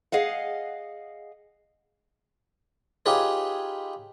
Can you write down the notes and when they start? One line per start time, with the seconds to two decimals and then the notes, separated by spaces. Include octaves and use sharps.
0.12 G#4 D#5 F5 F#5
3.06 D#4 F4 G4 G#4 B4 C#5